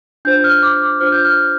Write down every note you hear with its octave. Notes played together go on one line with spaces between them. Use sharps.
D4 F4 C5 G6
F6
D6
D6
D4 F4 C5 F6
G6
F6